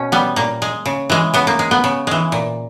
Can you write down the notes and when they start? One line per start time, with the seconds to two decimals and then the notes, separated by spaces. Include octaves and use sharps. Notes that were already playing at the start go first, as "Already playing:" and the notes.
Already playing: B2 C#4
0.12 G3 B3
0.36 A#2 A#3
0.62 G#3
0.86 C#3
1.10 E3 G#3
1.34 C#3 B3
1.47 A#3
1.59 G#3
1.71 B3
1.84 C#3
2.07 E3 G#3
2.32 A#2